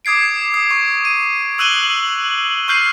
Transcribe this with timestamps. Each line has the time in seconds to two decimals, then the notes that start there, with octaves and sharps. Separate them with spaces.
0.05 D6 D#6 G#6 C7 D7
0.54 D#6
0.71 C#6
1.05 D#7
1.58 C#6 E6 F#6 D#7 F#7 G7
2.68 C#6 F6 G6 C7 D#7